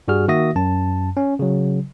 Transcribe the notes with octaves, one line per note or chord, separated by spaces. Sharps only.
G2 G3 F#4 G#4 F6
D#3 A#3 F#4 E5 D#6 A#6
F#2 A5
C#4
C#3 F#3